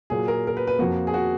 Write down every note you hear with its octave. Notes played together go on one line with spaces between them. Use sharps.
A#2 F#3 A#3 G#4
A#4
A#4
B4
B4
F2 F3 A#3 F#4
G#4
F#4